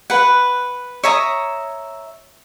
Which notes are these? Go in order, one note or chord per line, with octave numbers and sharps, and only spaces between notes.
B4 F#5
C#5 E5 A#5 D#6